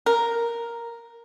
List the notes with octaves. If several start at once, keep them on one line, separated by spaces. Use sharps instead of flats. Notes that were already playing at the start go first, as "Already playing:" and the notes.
A#4